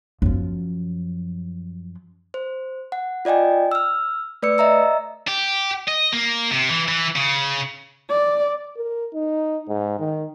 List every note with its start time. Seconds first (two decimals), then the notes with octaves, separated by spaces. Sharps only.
0.22 F#2 F3
2.34 C5
2.92 F#5
3.25 F4 D5 D#5 G5 G#5
3.71 E6 F6
4.42 A3 B4 D5 E6 C#7
4.58 D#5 E5 A#5 E6
5.28 G4
5.88 D#5
6.12 A#3
6.51 C3
6.69 E3
6.89 E3
7.16 C#3
8.09 D5
8.77 A#4
9.14 D#4
9.68 G#2
10.00 D#3